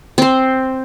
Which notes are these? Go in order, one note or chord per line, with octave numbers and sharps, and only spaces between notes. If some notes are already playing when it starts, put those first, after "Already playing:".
C4 C5